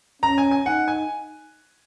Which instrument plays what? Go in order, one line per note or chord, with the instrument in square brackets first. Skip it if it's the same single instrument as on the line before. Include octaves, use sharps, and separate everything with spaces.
[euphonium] C#4 [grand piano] A#5
[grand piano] G#5
G#5
[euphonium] D#4 [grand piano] F#5
[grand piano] G#5